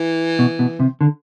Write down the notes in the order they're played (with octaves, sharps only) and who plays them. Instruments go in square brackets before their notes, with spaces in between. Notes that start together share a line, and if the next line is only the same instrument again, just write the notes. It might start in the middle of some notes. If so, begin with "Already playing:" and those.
Already playing: [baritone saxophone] E3
[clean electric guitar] B2
B2
C3
D3